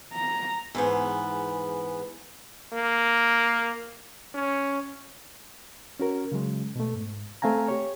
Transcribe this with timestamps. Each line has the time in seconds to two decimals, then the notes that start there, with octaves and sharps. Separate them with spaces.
0.14 A#5
0.75 E2 G#2 B3
2.73 A#3
4.34 C#4
6.00 C#4 F#4 A#4
6.32 C#3 F#3 G#3
6.76 B2 A3
6.95 G#2
7.42 A3 C4 F5 G#5 A#5
7.68 G4 C#5